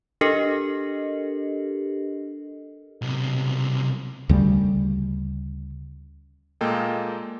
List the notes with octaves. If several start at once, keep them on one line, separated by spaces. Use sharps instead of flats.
D4 G4 A4 A#4 D#5
B1 C3
D2 C#3 G3
A#2 G#3 A#3 A4 D#5 G5